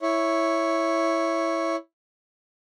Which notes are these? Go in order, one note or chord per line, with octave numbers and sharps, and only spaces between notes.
E4 C#5